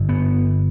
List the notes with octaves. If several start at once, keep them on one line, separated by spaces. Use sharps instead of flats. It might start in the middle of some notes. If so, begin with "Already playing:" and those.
Already playing: G1 G2
B3